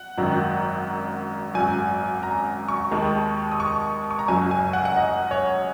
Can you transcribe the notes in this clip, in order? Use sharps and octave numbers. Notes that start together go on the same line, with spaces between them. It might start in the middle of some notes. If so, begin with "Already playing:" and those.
Already playing: F#5
G#1 F#2 D#3 F#3
G#1 F#2 F#3 G#5
A#5
C#6
D#2 D#3 G#3
D#6
C#6
C#6
A#5
F#1 F#2 F#3 G#5
G#5
F#5
F#5
D#5
C#5